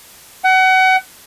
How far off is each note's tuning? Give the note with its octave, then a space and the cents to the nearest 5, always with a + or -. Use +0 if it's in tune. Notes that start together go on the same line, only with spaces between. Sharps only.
F#5 +30